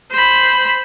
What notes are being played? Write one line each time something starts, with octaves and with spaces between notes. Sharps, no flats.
C5 B5